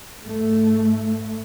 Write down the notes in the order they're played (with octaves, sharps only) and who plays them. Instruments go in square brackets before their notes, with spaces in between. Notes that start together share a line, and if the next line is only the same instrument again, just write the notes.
[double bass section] G#2 A3